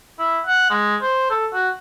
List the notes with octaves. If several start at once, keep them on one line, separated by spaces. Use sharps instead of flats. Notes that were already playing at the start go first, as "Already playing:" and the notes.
E4
F#5
G#3
C5
A4
F#4